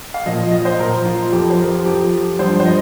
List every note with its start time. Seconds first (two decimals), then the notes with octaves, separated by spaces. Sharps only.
0.14 F5
0.26 A#2 F3 D#5
0.51 D#5
0.65 C5
0.80 A#2 F3 A#4
1.05 F4
1.32 F2 F3 G4
1.50 C5
1.59 A#4
1.85 F2 F3 G4
2.39 G2 F3 C5
2.60 C5
2.65 D#5